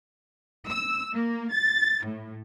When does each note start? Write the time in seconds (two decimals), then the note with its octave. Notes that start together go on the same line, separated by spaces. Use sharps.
0.68 E6
1.13 A#3
1.53 A6
2.04 A2